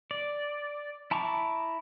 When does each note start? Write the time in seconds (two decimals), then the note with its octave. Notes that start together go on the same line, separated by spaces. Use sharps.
0.11 D5
1.11 E4 A5 A#5 C#6 D6